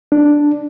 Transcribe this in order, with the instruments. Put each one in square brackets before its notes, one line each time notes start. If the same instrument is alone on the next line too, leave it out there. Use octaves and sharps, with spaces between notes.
[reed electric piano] D4